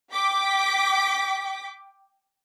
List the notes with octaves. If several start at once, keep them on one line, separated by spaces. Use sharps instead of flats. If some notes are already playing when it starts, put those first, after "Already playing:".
G5 D6 B6